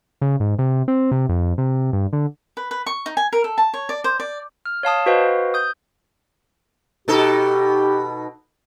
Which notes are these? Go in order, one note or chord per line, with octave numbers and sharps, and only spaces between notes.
C#3
G#2
C3
C4
C3
F2
C3
G2
D3
B4
B4
C#6
D#4
G#5
A#4
A4
A5
C#5
D5
C5
D5
F6
C#5 F5 A5 D#6
F#4 B4 C5 D#5 F5 G5
D#6 G6
B2 D#4 G4 A4